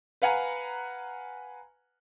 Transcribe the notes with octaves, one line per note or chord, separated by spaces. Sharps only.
B4 F5 F#5 G#5 A#5